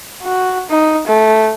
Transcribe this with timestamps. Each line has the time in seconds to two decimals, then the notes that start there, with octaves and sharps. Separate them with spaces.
0.22 F#4
0.70 D#4
1.07 A3